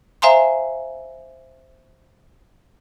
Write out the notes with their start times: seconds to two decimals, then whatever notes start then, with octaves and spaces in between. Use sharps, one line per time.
0.22 C5 E5 F5 G#5 A#5 C6